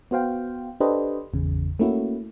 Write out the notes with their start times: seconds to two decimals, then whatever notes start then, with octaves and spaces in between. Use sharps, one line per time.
0.11 B3 F#4 C5 F5 G5
0.80 D4 G4 A4 B4 C5 D#5
1.33 G#1 E2 C#3
1.79 A3 A#3 C#4 E4 F#4